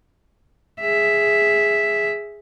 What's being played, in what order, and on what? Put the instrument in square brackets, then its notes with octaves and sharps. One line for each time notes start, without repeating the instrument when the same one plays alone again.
[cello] G#4 E5